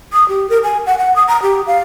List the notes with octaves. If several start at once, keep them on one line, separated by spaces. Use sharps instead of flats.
D#6
G4
A#4
G#5
F#5
F#5
D#6
A#5
G4
F5